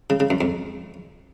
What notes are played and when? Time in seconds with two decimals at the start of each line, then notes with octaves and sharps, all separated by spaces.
0.10 C#3
0.20 C#3
0.30 F#2
0.41 F2